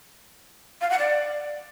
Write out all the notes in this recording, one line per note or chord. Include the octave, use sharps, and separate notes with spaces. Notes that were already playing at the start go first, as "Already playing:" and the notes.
F5
F#5
D5